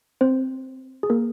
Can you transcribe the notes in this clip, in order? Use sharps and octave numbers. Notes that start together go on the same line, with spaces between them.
C4 C5
G#4
A#3 A#4